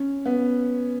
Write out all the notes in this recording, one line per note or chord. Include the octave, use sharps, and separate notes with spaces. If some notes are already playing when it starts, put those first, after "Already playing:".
Already playing: C#4
B3